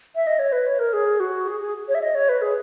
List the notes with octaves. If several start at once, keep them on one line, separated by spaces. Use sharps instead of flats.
E5
D#5
C#5
B4
C#5
A#4
G#4
F#4
G#4
G#4
C#5
E5
D#5
C#5
B4
G#4